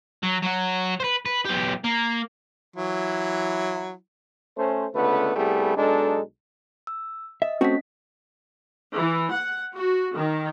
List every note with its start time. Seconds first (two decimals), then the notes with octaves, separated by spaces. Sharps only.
0.23 F#3
0.42 F#3 F#4
1.00 B4 C5
1.25 B4
1.45 B1 G4
1.84 A#3
2.76 E3 F#3 E4
4.58 A3 C#4 C5
4.95 C#2 D3 A3 B3 B4
5.35 C2 G3 A3 B3 G#4
5.76 B1 G#3 D4 D#4 A4
6.87 E6
7.42 D#5 E5
7.61 A3 C4 C#4 F#4 B6
8.95 E3
9.32 F#5
9.75 F#4
10.16 D#3